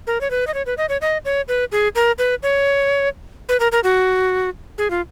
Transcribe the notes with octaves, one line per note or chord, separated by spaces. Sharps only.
A#4
C#5
B4
D#5
C#5
B4
D#5
C#5
D#5
C#5
B4
G#4
A#4
B4
C#5
B4
A#4
A#4
F#4
G#4
F4